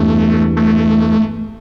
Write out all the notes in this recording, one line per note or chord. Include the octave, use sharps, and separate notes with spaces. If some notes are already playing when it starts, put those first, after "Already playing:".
Already playing: E2 G2 A3
A3